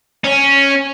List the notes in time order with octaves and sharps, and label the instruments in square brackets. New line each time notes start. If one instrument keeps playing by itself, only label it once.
[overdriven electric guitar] C#4